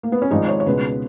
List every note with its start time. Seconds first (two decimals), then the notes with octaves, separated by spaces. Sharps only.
0.03 A#3
0.12 B3
0.22 C#4
0.31 G#1 G#2 F3 G#3 D#4
0.48 C#5
0.60 C#5
0.66 C#2 B2 G#3 B4